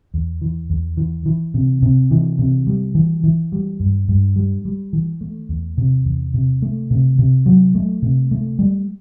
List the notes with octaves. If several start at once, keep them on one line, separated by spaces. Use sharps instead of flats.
E2
E3
E2
E3
E3
C3
C3
E3
C3
G3
E3
E3
G3
G2
G2
G3
G3
E3
A3
E2
C3
E2
C3
A3
C3
C3
F#3
A3
C3
A3
G3